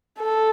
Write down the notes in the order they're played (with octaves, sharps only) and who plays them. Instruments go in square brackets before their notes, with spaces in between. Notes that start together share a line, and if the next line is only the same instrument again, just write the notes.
[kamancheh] A4